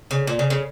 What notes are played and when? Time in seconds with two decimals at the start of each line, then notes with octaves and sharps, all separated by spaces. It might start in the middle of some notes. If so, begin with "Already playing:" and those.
0.11 C#3
0.27 A#2
0.39 C#3
0.50 C#3